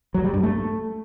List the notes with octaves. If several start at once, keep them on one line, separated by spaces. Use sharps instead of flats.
F#3
G3
G2
A3